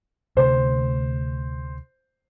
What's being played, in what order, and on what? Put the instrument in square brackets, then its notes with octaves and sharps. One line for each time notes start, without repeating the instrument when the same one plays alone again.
[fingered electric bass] D2 C3 A3 [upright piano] C5